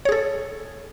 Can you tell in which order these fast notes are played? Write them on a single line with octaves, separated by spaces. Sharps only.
C#5 G#4 A4